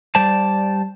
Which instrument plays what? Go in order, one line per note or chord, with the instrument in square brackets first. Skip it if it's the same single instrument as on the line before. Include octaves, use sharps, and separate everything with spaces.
[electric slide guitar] G3 C5 D5 A5